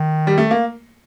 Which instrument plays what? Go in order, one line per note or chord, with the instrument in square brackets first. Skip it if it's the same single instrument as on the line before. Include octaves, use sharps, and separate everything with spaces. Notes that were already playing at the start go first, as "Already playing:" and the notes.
Already playing: [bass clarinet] D#3
[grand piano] G3
A3
A#3